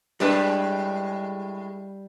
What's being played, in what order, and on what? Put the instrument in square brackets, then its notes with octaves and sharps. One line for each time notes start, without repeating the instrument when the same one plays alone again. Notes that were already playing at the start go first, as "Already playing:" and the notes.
[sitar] A2 G#3 B4 [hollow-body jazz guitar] G3 D4